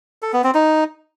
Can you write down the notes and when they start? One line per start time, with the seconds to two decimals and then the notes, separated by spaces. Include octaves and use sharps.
0.22 A4
0.33 B3
0.44 C4
0.55 D#4